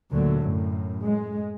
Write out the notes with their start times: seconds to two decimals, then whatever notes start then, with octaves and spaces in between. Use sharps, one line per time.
0.10 D2 A#2 D3 F#3
0.40 F#2 A2
1.03 G#3